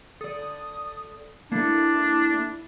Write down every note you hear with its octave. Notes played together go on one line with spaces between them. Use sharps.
A4 D5 D#6
A#3 D4 E4 A4